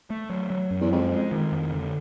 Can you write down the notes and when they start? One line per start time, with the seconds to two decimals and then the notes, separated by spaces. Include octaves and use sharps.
0.10 A3
0.30 F#3
0.50 F#3
0.71 F#2
0.81 E2
0.91 F2 G#3
1.11 G#3
1.32 D#3
1.52 F2
1.72 D3